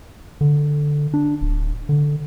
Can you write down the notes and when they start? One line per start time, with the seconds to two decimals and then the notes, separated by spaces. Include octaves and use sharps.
0.41 D3
1.14 D4
1.41 D1
1.89 D3